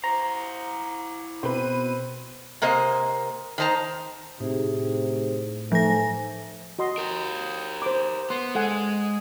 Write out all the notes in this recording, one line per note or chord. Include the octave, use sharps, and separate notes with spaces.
E4 C5 A#5
B2 C4 B4 D#7
C3 A#3 A#4 C5 D#5
D#3 D#4 C5 A5 A#5
A2 C3 D#4 G#4
F3 F#3 A3 C5 G#5 A#6
F#4 D#5 C6
G4 A#4
C5 D6
B3 C6
G#3 A4 F#5 G#5